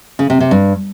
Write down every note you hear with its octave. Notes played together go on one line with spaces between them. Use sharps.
C#3
C3
C3
G2